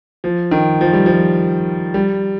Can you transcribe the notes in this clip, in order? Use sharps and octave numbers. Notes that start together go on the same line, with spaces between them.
F3
D#3
F3
G3
F3
G3